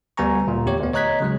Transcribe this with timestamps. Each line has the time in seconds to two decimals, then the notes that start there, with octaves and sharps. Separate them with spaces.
0.17 D2 G3 B3 G#5 A#5 C#6
0.47 D2 A#2
0.66 E2 G4 C#5
0.80 D2 B3
0.93 C#5 D#5 A#5 F#6 G#6 B6
1.20 C#3 F#3 G#3